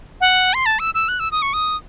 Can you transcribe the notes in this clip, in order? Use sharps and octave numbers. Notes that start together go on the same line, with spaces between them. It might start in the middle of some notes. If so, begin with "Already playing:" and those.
F#5
C6
A5
E6
E6
F#6
E6
D#6
C#6
D#6